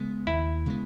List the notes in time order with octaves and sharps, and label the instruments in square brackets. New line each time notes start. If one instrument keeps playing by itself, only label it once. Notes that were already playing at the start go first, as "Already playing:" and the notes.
Already playing: [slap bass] C#3 G#3 B3
[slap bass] D#2 [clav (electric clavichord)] E4
[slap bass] C#3 G#3 B3